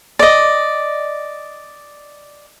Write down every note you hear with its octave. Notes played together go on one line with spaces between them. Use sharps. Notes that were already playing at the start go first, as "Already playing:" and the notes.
D5 D#5